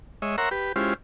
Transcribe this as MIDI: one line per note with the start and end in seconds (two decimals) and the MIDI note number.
0.22 0.36 56
0.22 0.36 73
0.22 0.36 75
0.22 0.36 76
0.38 0.49 70
0.38 0.49 73
0.38 0.49 76
0.38 0.49 78
0.38 0.49 82
0.38 0.49 84
0.51 0.72 67
0.51 0.72 71
0.76 0.94 56
0.76 0.94 61
0.76 0.94 64
0.76 0.94 65
0.76 0.94 67
0.76 0.94 72